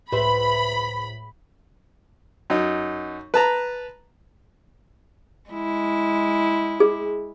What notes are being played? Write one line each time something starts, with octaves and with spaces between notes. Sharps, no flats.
C#2 A2 B4 C5 E5 B5
F#2 D#4
B4 A5 A#5
G#3 E4
G#4